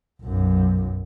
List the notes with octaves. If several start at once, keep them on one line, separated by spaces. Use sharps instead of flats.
B1 F#2